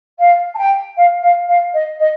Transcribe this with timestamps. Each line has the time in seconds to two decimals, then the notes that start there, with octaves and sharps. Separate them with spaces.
0.19 F5
0.54 A5
0.57 G5
0.97 F5
1.22 F5
1.48 F5
1.73 D#5
1.99 D#5